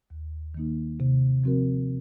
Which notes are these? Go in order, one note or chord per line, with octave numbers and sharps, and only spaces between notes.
D#2
D#3 A#3 D#4
C3
F3 C4 F#4 A#4